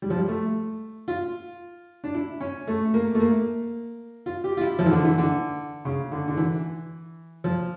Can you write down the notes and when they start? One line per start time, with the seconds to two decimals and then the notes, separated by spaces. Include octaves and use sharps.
0.02 G3
0.10 F3
0.17 G3
0.28 A3
1.08 F4
2.04 D4
2.15 E4
2.41 C#4
2.67 A3
2.94 A#3
3.15 A3
3.20 A#3
4.26 F4
4.44 G4
4.57 F4
4.61 E4
4.79 F3
4.86 E3
4.91 D3
5.05 E3
5.18 D3
5.85 C#3
6.12 D3
6.28 D3
6.37 E3
7.44 F3